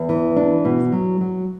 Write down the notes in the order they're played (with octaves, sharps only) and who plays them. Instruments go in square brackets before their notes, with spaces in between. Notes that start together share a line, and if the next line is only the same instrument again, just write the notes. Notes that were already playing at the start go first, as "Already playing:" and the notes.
Already playing: [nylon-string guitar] E2
E3
D4
B2
F#3
F#3